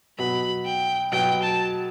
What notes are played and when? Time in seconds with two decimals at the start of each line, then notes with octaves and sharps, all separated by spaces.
0.18 B2 F#3 B3 F#4 B5
0.65 G5
1.12 B2 F#3 B3 F#4 G5
1.42 A5